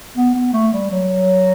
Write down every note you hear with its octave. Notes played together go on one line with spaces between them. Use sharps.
B3
B3
A3
G3
F#3